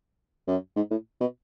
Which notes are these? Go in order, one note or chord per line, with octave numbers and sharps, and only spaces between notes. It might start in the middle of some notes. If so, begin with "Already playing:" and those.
F#2
G#2
A2
B2